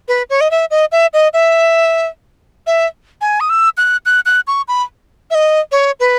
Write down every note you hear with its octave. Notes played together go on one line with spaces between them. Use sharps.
B4
C#5
D#5
E5
D#5
E5
D#5
E5
E5
G#5
D#6
E6
F#6
F#6
F#6
C#6
B5
E5
D#5
C#5
B4